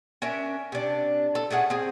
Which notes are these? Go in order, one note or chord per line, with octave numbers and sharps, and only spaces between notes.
C#4 D4 A#4 E5
C3 D4
A4
A3 C#4 G#4 F#5
C4 G#4